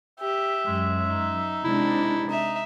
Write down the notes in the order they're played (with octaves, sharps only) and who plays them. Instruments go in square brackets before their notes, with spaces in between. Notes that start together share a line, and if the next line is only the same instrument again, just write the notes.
[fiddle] G4 [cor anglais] E5
[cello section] F#2 [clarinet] G#3
[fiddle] D#4
[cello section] C3 G#3 D4 [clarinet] E4
[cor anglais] D#4 [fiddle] E5